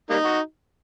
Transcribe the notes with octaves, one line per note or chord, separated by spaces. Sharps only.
G3 A#3 D#4
F#4